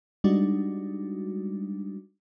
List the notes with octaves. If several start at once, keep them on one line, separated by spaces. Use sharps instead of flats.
G3 G#3 D4 D#4 F#4